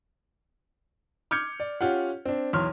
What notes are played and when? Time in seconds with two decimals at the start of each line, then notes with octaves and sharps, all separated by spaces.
1.31 D6 F6 G6 G#6 C#7
1.60 D5
1.81 C#4 F4 G4 F#5
2.25 C4 D4
2.53 B1 E2 C#5 C6 F6